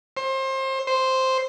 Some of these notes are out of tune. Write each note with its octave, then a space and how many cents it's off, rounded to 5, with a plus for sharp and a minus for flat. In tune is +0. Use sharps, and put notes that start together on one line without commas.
C5 +30
C5 +0